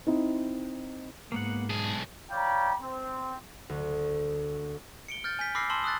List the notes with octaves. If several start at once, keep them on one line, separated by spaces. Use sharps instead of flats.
C4 D#4 E4
G#2 A#3 B3 F#5
B1 G#4 A5
C#5 D5 F5 G5 A#5 B5
C4
D2
C#7 D7 G7
F6 G6 A6
G#5 G6 B6
B5 D6 E6 F6 A#6 C7
A5 C6 E6 F#7 G7
D#6 E6 F#6 A6